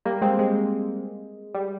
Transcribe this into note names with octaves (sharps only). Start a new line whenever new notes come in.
G3 A#3
G#3 C4
G#3
G3